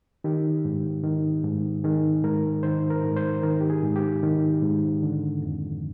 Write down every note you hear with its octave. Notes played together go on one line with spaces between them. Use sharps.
D#3 G4
G#2
D#3
G#2
D#3 G#4
G#2 A#4
D#3 C5
A#4
G#2
C5
D#3 A#4
G4
G#4
G#2
G4
D#3
G#2
D3
F2